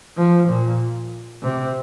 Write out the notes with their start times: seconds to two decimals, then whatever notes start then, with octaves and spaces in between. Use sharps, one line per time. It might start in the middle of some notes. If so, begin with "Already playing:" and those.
0.17 F3
0.48 A#2
1.43 C3